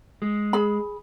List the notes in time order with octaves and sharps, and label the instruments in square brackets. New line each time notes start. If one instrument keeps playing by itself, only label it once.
[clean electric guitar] G#3
[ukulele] G#4 B5